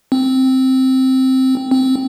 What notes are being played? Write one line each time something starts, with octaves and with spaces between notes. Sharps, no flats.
C4
C4